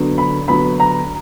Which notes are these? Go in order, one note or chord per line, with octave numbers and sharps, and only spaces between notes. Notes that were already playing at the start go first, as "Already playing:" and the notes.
Already playing: D3 F#3 B3
B5
D3 F#3 B3 B5
A#5